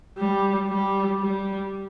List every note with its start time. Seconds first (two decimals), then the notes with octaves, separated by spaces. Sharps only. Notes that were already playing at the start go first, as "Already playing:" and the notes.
0.18 G3
0.69 G3
1.20 G3